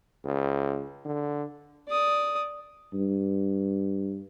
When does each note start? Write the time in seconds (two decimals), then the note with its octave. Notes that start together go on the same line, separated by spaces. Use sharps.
0.25 C#2
1.05 D3
1.89 D5 D#6
2.94 G2